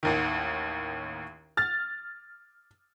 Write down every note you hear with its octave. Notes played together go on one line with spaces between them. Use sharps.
A1 D#2 D#3
F6 A6